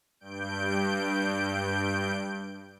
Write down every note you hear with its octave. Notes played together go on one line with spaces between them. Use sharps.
G2 G6 D7